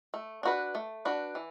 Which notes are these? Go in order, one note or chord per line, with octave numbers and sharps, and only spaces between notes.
A3
D4 F#4 B4
A3
D4 F#4 B4
E3